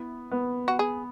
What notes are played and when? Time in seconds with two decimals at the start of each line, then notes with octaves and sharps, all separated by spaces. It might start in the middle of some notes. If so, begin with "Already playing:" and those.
Already playing: B3 E4
0.31 B3
0.68 F#4
0.79 G#4